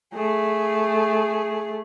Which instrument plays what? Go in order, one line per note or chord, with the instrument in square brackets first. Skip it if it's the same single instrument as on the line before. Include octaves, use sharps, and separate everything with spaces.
[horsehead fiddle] A3 G#4